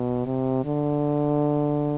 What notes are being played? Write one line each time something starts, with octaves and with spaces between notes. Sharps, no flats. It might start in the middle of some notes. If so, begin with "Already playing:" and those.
Already playing: B2
C3
D3